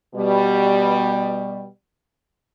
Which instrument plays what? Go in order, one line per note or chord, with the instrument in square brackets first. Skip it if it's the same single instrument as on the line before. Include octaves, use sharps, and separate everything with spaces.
[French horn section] B2 G3